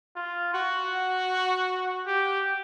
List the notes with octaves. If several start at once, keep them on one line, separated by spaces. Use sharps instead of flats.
F4
F#4
G4